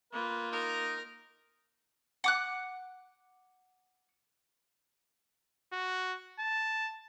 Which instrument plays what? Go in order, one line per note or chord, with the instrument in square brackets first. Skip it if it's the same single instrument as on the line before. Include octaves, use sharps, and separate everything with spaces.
[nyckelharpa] A#3 F4 [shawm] B4
[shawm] D#4 [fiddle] A#4
[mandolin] F#5 D6 F#6
[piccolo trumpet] F#4
A5